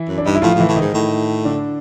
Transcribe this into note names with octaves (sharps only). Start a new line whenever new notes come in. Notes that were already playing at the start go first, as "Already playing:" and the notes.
Already playing: E3 E4
F#2
D4
G2 D#4
E4
A2 F3 F4
A2
E3 E4
A2
G#2 D#3 D#4
A2
D3 D4